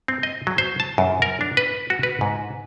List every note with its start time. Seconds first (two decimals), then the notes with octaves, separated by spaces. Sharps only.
0.08 C4
0.23 D#5
0.47 F#3
0.58 C5
0.80 A5
0.98 F#2
1.22 A#4
1.41 D4
1.57 B4
1.90 F#4
2.03 B4
2.21 G#2